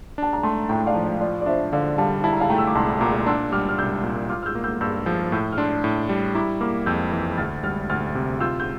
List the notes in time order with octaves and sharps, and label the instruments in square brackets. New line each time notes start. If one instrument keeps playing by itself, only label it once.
[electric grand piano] D4 [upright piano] A5
[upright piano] A#5
[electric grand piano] A3 [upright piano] A5 C6
[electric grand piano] A2 [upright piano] G5 A#5
[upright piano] D5 F5
[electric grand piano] F3
[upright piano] D5
[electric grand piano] F4 [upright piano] D5
[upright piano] D5
[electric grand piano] D4 [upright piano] C5 E5
[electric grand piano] D3 [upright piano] D5 F5
[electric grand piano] G3 [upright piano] F5 A5
[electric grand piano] E4 [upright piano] A5
[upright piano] A#5
F5 A5
[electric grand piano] A3 [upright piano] G5 A#5
[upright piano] E6
D6
[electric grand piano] C2 [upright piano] A5 C6
[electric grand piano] A#2 [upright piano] A#5 D6
[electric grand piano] D4 [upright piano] C6 E6
[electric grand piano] G3 [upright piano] D6 F6
[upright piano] F6
[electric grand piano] C2 [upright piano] E6 G6
[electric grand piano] A#2
[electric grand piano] F4 [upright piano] D6 F6
[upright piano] F6
E6 G6
[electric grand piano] A#3
[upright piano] E6 G6
[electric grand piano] G2 [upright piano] E6 G6
[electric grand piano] F3 [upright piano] E6 G6
[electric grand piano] A2 [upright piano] E6 G6
[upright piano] F6
[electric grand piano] D4 [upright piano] C6 E6
[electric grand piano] A2
G3
[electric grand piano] E4 [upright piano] A#5 D6
[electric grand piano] A#3 [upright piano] D6 F6
[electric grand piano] F2 [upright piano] E6 G6
[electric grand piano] E3
[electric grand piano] D2 [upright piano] F6 A6
[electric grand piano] G3 [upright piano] F6 A6
[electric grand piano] D2 [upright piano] F6 A6
[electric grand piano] C3
[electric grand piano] F4 [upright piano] E6 G6
[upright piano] G6